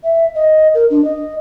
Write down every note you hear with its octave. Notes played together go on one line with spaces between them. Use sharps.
E5
D#5
A#4
D4
D#5